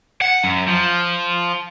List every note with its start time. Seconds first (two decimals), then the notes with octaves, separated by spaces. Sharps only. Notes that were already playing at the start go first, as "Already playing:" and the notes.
0.21 F#5
0.44 F#2
0.68 F3